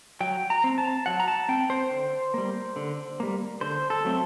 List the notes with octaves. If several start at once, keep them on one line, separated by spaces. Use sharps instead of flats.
F#3 G5
A#5
C4
A5
F#3 F#5
A#5
A5
C4 G5
C5
D3
G3 A#3
D3
G3 A#3
D3 C5
A4
F#3 A3 C4